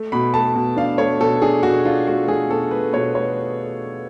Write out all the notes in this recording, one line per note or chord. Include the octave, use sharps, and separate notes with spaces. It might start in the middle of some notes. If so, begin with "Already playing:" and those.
Already playing: A3
B2 B5
A3 A5
B2
D4 F5
A3 C#5
B2 A4
D4 G#4
B2 F#4
D4 F4
A3 F#4
A3 G#4
B2 A4
A3 B4
B2 C#5
A3 C#5